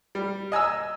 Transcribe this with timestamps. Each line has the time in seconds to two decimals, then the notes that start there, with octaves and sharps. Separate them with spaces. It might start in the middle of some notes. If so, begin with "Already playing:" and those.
0.15 G3
0.52 D#5 G#5 A#5 E6